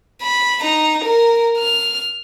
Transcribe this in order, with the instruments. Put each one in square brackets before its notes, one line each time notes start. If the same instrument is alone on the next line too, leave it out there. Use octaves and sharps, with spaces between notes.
[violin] B5
D#4 A#5
A#4
F6